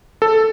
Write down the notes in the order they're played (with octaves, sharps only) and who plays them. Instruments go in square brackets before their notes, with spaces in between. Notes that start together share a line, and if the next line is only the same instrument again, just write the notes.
[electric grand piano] A4